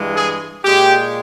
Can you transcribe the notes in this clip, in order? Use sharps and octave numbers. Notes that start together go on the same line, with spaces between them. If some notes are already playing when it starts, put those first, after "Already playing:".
Already playing: G2 E3 G#3
G#4
A#2 G#3 G4